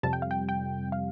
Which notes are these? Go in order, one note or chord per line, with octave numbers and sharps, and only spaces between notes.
F2 C3 G3 A5
G5
F5
G5
G5
F5